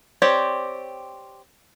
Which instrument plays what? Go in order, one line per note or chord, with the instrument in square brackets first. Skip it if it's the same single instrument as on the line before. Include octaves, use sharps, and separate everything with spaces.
[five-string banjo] C4 G4 C#5 D5